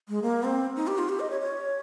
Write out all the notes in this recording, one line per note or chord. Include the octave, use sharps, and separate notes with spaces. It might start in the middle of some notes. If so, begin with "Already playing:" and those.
G#3
A#3
C4
D#4
G4
F4
G4
D#5
C#5
C#5